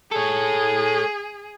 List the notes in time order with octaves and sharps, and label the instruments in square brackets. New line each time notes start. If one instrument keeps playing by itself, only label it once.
[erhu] G#4 [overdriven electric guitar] A4 C#5